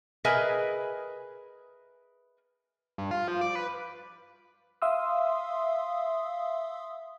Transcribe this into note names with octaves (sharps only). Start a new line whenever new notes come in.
G#4 A#4 B4 D#5 E5 G#5
G2
F4
F3
D5
B4
E5 F5 C6 D#6 E6